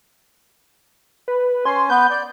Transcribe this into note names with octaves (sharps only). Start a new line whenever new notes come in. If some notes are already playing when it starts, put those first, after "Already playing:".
B4
C#4 G#5 C6
B3 B4 G6
D5